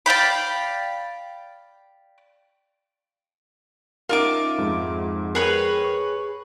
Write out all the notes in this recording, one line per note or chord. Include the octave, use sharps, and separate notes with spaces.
D5 F5 G5 B5
C#4 D#4 F4 A#4 E5 D6
F2 G#2
G#4 A#4 B4 C#5 G5
C#6